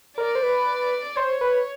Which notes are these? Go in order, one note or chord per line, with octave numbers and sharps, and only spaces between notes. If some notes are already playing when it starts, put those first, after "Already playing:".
A#4 D5
C5
B4
C5 C#5
B4